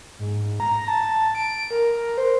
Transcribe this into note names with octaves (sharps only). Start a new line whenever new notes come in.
G#2
A#5
A5
D7
A#4
C5